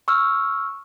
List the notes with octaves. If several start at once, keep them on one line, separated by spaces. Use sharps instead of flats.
C#6 E6 F6